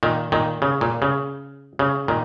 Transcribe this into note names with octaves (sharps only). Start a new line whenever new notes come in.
A#2 D#3
A#2 D#3
C#3
A#2
C#3
C#3
A#2 D#3